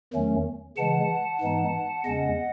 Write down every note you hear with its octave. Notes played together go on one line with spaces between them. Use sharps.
E2 D#3 F#3 A3 C#4
C#3 E3 G#3 F#5 A5
G#2 E3 G#3 B3 D#4
E2 C#3 G#3 C#4 D#5 F#5